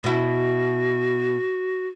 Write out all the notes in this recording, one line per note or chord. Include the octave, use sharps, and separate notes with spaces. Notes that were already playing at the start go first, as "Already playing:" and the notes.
B2 E4 F#4